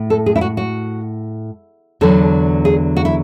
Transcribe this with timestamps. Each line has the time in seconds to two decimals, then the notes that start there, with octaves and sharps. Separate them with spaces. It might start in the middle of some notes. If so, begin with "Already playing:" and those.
Already playing: A2
0.10 A4
0.26 G#4
0.36 E4
0.41 F#4
0.57 F#4
2.01 E2 D3 F#3 A4
2.65 G#4
2.97 F#4
3.05 E4